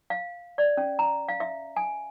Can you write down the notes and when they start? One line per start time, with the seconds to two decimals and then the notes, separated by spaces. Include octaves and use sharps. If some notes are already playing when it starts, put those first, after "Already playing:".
0.10 F5
0.58 D5
0.77 C#4
0.99 A#5
1.29 F5
1.40 E5
1.76 G#5